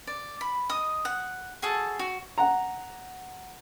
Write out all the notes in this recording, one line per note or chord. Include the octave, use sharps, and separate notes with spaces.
D5
B5
D#5 D#6
F#5
F#4 G#4 A4 A5
F#4
F#5 A#5